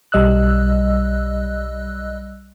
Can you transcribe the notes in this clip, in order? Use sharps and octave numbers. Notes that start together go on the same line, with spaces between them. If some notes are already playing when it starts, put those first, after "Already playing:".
B1 G3 D#5 E6 F#6